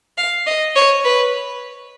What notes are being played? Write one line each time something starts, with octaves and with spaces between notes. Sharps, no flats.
F5
D#5
C#5
B4